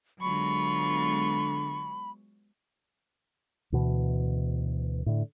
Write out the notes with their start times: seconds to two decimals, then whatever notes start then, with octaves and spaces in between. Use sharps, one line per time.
0.21 D3 F#3 G#3 B3 F4 B5 C#6
3.72 D2 B2 E3
5.06 A2 D3